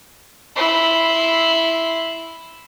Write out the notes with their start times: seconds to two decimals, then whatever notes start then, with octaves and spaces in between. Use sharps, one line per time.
0.56 E4 C6